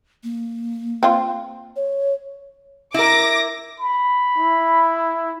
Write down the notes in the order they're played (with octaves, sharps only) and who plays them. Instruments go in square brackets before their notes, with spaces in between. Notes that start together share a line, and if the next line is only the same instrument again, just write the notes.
[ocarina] A#3
[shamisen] C4 F4
[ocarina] C#5
[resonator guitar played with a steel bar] E4 A#4 [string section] D6 A#6
[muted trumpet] B5
[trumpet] E4